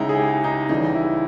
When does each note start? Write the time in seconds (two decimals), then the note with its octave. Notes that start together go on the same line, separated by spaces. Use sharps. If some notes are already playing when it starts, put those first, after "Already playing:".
Already playing: C#2 C#3 G#3 D#4 E4
0.09 G#4
0.19 G4
0.44 D#4
0.69 C#2 C#3 E3 G3 D#4
0.95 E4